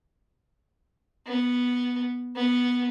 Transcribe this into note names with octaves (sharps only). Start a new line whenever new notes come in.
B3
B3